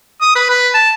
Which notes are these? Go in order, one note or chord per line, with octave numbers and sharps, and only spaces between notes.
D#6
B4
B4
A5